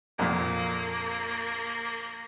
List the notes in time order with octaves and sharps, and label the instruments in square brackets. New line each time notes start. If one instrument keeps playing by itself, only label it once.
[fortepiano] F2 A#2 [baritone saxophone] A#3